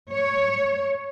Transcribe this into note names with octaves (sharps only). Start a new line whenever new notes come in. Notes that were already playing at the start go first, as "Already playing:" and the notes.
C#5